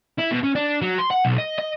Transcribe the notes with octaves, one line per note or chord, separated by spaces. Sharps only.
E4
B2
C#4
D4
F#3
C6
F#5
B1
D#5
D#5